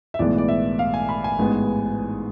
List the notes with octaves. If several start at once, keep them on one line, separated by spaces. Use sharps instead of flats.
E5
B1 A2 E3 G#3 B3 D5
D5
E5
F5
G#5
B5
G#5
A1 G#2 G#3 B3